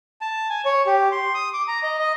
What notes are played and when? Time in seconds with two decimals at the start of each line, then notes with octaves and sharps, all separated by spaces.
0.21 A5
0.50 G#5
0.65 C#5
0.86 G4
1.12 C6
1.34 D#6
1.53 D6
1.68 A#5
1.83 D#5
1.99 D#5